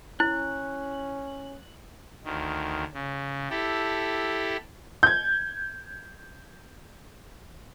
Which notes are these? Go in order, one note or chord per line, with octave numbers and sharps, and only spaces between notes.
C#4 E4 F#6
D2 D#3
C#3
E4 G4 A4
G6 G#6